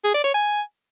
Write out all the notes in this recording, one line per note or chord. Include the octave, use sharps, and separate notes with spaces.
G#4
D5
C#5
G#5